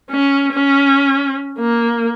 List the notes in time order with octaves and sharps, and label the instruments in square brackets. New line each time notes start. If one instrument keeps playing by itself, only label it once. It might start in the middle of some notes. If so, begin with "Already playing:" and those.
[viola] C#4
C#4
A#3